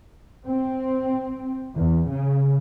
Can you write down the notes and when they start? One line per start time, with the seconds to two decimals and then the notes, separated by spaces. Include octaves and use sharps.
0.46 C4
1.75 E2
2.09 C#3